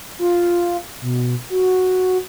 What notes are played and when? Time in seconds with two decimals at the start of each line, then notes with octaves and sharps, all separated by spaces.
0.19 F4
1.02 B2
1.50 F#4